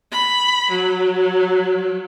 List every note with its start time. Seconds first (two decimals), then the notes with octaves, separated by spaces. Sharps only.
0.11 B5
0.70 F#3